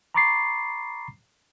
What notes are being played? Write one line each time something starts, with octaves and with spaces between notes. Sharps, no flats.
A#5 B5 C#6 D6 A6 C7